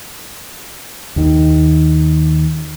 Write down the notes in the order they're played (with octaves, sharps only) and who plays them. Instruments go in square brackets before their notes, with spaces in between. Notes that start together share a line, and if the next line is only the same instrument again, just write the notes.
[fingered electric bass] D#2 D#3